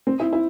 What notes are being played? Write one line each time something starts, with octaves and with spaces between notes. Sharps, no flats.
C4
E4
E4